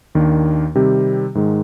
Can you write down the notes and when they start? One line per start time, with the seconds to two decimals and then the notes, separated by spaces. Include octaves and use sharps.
0.15 D#2 D#3 A#3 D4
0.75 C3 D#3 G3 C4 G4
1.35 G#2 D#3 G#3